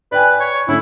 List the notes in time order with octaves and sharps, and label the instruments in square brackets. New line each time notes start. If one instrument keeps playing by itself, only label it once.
[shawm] B4 [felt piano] D5 G5 G#5
[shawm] C#5
[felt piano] D3 A3 C#4 [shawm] E4